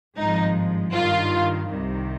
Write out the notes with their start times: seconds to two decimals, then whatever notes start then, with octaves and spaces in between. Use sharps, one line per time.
0.18 G#1 G2 F3 G#3 D#4
0.94 G2 D#3 G3 F4
1.71 C2 C3 D#3 G3